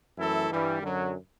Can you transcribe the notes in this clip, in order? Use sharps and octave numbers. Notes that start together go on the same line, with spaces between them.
F#2 E3 A3 E4 A4
G2 E3 G3
F#2 D3 F#3